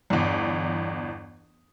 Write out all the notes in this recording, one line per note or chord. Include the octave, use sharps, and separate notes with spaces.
G1 E2